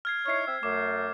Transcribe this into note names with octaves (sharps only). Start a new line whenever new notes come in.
F6 G#6 C7
D#4 E4 C#5 F6 C7
C4 E5
F#2 A3 D6